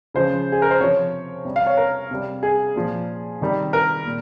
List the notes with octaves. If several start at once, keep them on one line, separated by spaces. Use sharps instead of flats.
C#3 F3 C5
G#4
A#4
C5
C3 F3 C#5
C3 G3
F5
C#5
A#4
C3 G3
G#4
A#2 F3
C3 D#3 G3
A#4
A#2